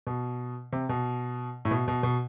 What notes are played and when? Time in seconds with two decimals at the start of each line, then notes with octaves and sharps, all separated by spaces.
0.07 B2
0.73 C3
0.89 B2
1.65 A2
1.71 B2
1.88 B2
2.03 B2